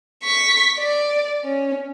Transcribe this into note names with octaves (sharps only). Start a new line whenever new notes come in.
C#6 B6
D5
C#4